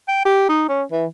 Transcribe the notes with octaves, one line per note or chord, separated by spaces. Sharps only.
G5
G4
D#4
C#4
E3